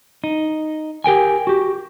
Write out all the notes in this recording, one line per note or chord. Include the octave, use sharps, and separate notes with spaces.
D#4
G4 A#4 G5 G#5
F#4 G4